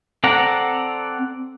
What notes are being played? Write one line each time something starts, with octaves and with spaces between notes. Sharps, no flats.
C4 A4 D5 F#5 A#5